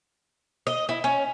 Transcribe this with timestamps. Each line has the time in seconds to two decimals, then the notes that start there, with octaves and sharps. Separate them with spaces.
0.67 D#5
0.89 E4
1.04 C#4